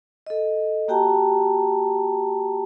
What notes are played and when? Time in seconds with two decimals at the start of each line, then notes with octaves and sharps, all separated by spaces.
0.27 A4 D#5
0.88 A#3 F#4 G4 G5 A5 A#5